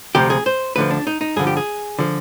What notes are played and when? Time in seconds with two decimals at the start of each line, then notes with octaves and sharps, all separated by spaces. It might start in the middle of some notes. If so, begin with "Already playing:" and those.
0.15 D2 C3 F3 G4
0.30 G#4
0.46 C5
0.76 D2 D3 F3 B4
0.91 D4
1.07 D#4
1.21 D#4
1.36 G2 D3 F3 G#4
1.47 G4
1.57 G#4
1.99 D3 F3